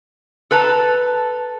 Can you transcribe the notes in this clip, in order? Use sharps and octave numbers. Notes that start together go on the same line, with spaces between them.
A4 B4 A5 A#5